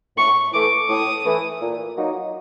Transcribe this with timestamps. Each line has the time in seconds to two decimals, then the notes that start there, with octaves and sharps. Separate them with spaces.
0.17 A2 C#6
0.52 E3 A3 D6
0.89 A2 D#6
1.25 E3 A3
1.61 A#2
1.97 F#3 A#3 D#4